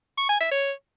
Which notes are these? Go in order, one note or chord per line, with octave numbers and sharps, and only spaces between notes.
C#6
G#5
E5
C#5